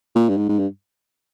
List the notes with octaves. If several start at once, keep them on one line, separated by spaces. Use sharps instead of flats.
A#2
G2
G#2
G#2
G2